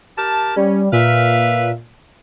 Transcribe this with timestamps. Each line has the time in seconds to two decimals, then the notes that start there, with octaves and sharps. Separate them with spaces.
0.17 G4 A#4 A5
0.56 G3 C#4
0.92 A#2 B4 E5 F5